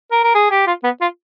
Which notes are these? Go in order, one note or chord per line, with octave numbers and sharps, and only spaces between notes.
A#4
A#4
G#4
G4
F4
B3
F4